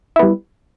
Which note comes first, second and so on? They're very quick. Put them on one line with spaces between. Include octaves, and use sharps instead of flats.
E4 B3 G3